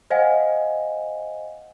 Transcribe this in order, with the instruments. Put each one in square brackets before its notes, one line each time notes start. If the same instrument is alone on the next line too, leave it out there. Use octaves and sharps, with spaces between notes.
[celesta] C5 D#5 F5 F#5 G#5